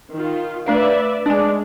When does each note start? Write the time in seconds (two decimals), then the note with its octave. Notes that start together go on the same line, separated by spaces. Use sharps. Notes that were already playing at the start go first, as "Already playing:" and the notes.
0.14 D#3 F4
0.67 A3 D4 B4 D5 E5 F5
1.26 G#3 D4 D5 G#5